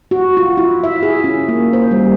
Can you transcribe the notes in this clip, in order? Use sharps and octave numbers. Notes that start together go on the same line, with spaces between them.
F#4
F4
E4
E5
G#4
C#4
A#3
C5
G3